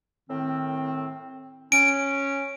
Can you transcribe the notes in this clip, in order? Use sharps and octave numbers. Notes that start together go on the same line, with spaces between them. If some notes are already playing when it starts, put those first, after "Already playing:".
A2 D#3 C4
C#4 D7